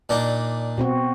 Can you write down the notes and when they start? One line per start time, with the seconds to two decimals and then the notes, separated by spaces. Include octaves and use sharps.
0.09 A#2 D4 D#4
0.78 B2 C4 F#4